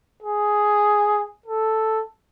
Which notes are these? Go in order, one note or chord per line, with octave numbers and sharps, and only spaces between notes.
G#4
A4